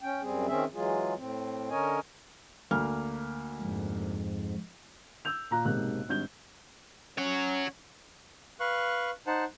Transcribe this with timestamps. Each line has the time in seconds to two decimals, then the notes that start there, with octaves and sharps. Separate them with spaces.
0.01 C#4 G5
0.22 F#2 G3 C4 G#4
0.48 D#3 C4 C#4 G#4 E5
0.74 E3 F#3 G#3 F4 G#4
1.17 A2 C4
1.70 D3 C#4 A#4 C#5 D#5 G#5
2.71 D2 A#3 F6
3.60 F2 G#2
5.25 E6 G6 F7
5.51 A#2 A#5 F#6
5.65 B1 G#2 C3 A#3 F#6
6.09 G#1 G2 G6 G7
7.18 C#4 C#5 F#5
8.60 B4 F5 C#6 F#6
9.27 D#4 C5 F#5 A5